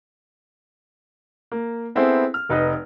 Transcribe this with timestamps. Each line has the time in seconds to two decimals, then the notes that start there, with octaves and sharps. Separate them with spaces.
1.52 A#3
1.95 B3 C4 E4 G#4 A4 C5
2.34 F6
2.49 F1 D#4 B4 D#5